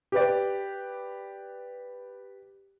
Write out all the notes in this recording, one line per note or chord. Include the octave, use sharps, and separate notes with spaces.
G4 B4 D5